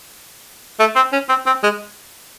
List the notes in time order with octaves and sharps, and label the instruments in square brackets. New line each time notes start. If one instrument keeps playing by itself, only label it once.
[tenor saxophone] A3
C4
C#4
C4
C4
G#3